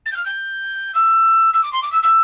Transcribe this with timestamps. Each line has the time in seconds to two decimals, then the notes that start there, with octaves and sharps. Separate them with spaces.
0.06 A6
0.12 G6
0.16 F6
0.25 G6
0.94 E6
1.54 E6
1.63 D6
1.72 C6
1.82 D6
1.92 E6
2.03 E6